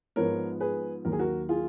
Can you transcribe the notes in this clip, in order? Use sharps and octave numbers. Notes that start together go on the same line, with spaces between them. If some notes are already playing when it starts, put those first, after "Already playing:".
G#2 F3 B3 A#4 C#5
G#4 B4
D#2 D#3 F#3 A#3 A#4
G#4
F#4 A#4
F4 G#4